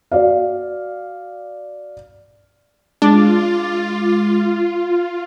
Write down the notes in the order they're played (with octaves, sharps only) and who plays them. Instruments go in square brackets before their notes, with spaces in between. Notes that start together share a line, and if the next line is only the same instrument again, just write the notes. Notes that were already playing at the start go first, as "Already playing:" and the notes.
[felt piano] F#4 D5 F5
[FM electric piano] G#3 D6 A6 [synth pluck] D4 [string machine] F4